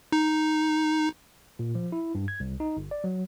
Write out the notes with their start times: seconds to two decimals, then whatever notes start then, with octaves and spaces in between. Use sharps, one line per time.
0.12 D#4
1.59 A#2
1.75 F3
1.92 E4
2.15 G2
2.28 G#6
2.40 C2
2.60 D#4
2.77 G1
2.91 D5
3.04 F#3